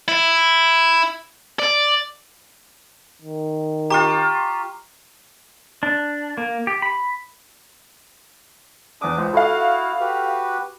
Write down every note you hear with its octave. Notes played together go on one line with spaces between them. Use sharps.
E4
D5
D#3
F4 G4 A#5 C#6
D4
A#3
G4
B5
E2 D4 D6 D#6
C#2 C5
E4 F#4 A4 F5
F#4 G4 B4